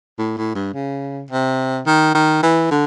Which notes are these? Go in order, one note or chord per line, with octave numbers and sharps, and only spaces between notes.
A2
A2
G2
C#3
C3
D#3
D#3
E3
D3